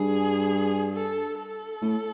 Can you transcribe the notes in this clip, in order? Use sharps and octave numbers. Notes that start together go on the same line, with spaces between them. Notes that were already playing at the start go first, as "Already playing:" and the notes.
Already playing: G2 G#4
A4
A4
A2